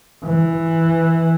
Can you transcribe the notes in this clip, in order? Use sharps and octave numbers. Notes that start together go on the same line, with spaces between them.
E3